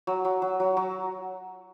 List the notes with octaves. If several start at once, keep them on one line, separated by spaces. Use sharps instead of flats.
F#3
F#3
F#3
F#3
F#3